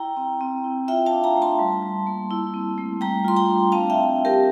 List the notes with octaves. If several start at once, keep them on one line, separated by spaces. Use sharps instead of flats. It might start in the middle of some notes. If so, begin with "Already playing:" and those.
Already playing: E4 G5 A#5
C4
C4
E4
F4 E5 G5
F5 A5
D4
G5 A#5
A3
A5 C6
G3
G3
A#3
E4
C4
A3
G3 G5 A#5
F4 C6
G5 A#5
D4
C4 F5 A5
E5 G5
E4
E4
G4 A#4